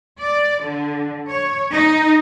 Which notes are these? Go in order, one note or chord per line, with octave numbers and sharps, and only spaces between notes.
D5
D3
C#5
D#4